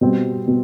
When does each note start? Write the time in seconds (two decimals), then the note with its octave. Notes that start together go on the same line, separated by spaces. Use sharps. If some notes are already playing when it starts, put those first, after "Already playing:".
0.01 B2 G3 C4
0.48 B2